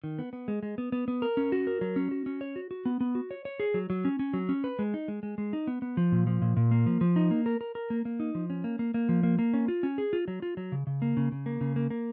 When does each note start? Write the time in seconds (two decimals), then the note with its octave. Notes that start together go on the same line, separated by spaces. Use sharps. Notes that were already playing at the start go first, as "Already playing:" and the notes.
0.04 D#3
0.19 B3
0.33 B3
0.48 G#3
0.63 G#3
0.78 B3
0.92 B3
1.08 B3
1.22 A#4
1.37 C#4
1.52 F#4
1.67 A#4
1.81 F#3
1.96 C#4
2.11 F#4
2.26 C#4
2.41 C#5
2.56 F#4
2.71 F#4
2.85 B3
3.01 B3
3.15 F#4
3.31 C#5
3.45 C#5
3.60 G#4
3.74 F#3
3.90 F#3
4.05 C#4
4.19 C#4
4.34 F#3
4.49 C#4
4.64 B4
4.79 G#3
4.94 D#4
5.08 G#3
5.23 G#3
5.38 G#3
5.53 D#4
5.67 B3
5.82 B3
5.97 F3
6.12 A#2
6.27 F3
6.42 A#2
6.57 A#2
6.71 A#3
6.86 F3
7.01 F3
7.16 D#4
7.31 A#3
7.46 A#4
7.61 A#4
7.75 A#4
7.90 A#3
8.05 A#3
8.20 D#4
8.35 F3
8.50 C#4
8.64 A#3
8.79 A#3
8.94 A#3
9.09 F3
9.23 A#3
9.39 A#3
9.54 C#4
9.68 F4
9.83 C#4
9.98 G#4
10.13 F4
10.28 F#3
10.42 F4
10.57 F#3
10.72 C#3
10.87 C#3
11.02 A#3
11.17 C#3
11.32 C#3
11.46 A#3
11.61 C#3
11.76 A#3
11.90 A#3